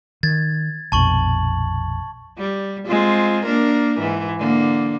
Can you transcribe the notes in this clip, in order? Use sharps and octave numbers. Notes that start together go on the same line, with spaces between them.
D#3 G#6 A6
A#1 F2 B2 A5 C#6 F#7
G3
G#3 C4 F4
A#3 D4 A#4
G#2 E3
D3 A#3